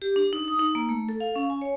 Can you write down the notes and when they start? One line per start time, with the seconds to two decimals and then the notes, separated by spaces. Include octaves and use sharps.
0.02 G4
0.16 D4
0.33 D#4
0.48 D#6
0.59 D#4
0.75 A#3
0.89 A3
1.09 A4
1.20 F5
1.36 C#4
1.50 G#5
1.62 C#5